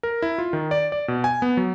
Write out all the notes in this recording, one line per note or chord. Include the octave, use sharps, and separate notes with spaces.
A#4
E4
F4
D#3
D5
D5
B2
G#5
B3
F#3